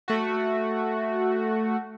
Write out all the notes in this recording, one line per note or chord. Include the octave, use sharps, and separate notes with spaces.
A3 F#4